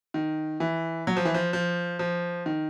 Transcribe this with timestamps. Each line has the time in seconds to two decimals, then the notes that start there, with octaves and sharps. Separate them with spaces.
0.14 D#3
0.60 E3
1.07 F#3
1.17 F3
1.25 E3
1.34 F3
1.53 F3
1.99 F3
2.46 D#3